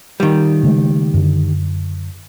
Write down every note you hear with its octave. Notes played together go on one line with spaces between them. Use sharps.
D#3 G3
C#3 G#3 A3
F#2 D3